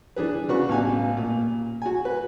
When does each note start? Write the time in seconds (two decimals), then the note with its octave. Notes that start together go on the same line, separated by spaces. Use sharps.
0.16 E3 D4 G#4 B4
0.48 C#3 D4 F#4 B4 C#6
0.69 A1 B2 F5 G#5
1.17 A#2
1.82 F#4 G#5
2.05 B4